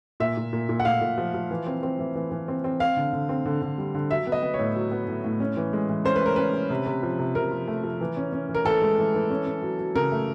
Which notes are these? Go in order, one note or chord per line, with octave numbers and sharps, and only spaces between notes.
A#2 E5
A#2
A#2
A#2
F#5
A#2 F5
A#2
F3
F3
E3
C4
C4
E3
E3
E3
C4
C4
C4 F5
D3
D3
C4
D3
D3
G3
D3
F#3 E5
B3
D#5
B3
C#5
A2
F#3
B3
A2
A2
C#4
E3
G#3
E3
C#4 C5
B4
C#4 A#4
C#4 B4
C#4
C3
C3
F3
C3
C3 A#4
F3
A3
F3
E3
C#4
C#4
E3
A#4
E3 A4
G#3
E3
E3
C#4
C#4
F#3
F#3
C#3 A#4
A3